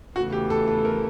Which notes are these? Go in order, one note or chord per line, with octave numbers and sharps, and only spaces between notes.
E2 C#3 E3 A3 F#4
G4
A4
A4
A#4